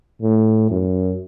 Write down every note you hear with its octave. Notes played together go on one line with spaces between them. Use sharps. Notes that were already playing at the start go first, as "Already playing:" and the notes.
A2
F#2